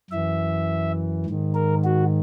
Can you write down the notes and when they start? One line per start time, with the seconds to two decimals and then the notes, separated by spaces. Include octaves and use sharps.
0.10 F#2 E3 E5
1.26 G#2 D#3
1.55 A#4
1.84 F#4